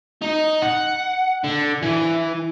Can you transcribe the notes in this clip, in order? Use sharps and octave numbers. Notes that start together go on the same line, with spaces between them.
D#4
F#5
D3
E3